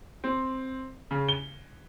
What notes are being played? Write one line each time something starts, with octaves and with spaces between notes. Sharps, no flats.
C4
C#3
G7